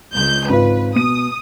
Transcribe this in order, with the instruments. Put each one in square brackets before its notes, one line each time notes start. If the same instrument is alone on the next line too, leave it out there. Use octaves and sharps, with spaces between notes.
[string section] C#2 G6
[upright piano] G#1 F4 [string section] B4
[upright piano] B2 D#7 [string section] D#6